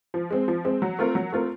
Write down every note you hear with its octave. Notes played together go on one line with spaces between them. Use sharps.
F3
G#3 C4
F3
G#3 C4
F#3
A3 C4 F4 A#4
F#3
A3 C4 F4 A#4